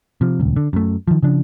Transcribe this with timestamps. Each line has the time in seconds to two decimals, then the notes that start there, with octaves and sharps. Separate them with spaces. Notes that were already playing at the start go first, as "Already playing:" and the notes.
0.21 C3 F3
0.40 D#1 C#2
0.56 D3
0.73 F#2 A3
1.08 D#3 F3
1.22 C#3 F3 D4